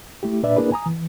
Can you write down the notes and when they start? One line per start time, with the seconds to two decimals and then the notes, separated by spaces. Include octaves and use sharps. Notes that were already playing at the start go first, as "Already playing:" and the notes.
0.23 A3 E4 G4
0.43 A#2 D4 B4 D5 E5
0.56 A#3 D4 E4 G#4 A#4 B4
0.72 G#5 A#5 D#6
0.86 E3